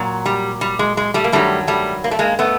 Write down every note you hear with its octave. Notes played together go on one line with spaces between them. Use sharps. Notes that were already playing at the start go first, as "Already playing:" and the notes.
Already playing: A#2 F#3
G3
G3
G#3
G#3
G3 A3
A#3
G2 D#3 F#3 G3 A3
G3 A3
A#3
A3
G#3 A#3
A3 B3